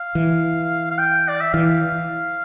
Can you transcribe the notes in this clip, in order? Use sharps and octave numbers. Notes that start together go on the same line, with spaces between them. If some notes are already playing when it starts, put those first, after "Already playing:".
Already playing: F5
E3
F5
G5
D5
E5
E3 F5